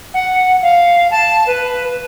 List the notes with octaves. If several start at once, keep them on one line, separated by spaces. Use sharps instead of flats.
F#5
F5
A5
B4